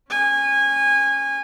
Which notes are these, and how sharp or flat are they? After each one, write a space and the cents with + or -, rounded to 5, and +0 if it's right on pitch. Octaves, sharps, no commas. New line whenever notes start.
C#4 +0 G#5 -20